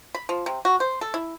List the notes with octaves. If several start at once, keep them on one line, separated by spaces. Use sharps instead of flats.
B5
F3
C3
F#4
C5
A4
E4